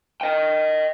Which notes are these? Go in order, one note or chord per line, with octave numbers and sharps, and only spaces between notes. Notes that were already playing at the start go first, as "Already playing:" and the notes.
D#5 G5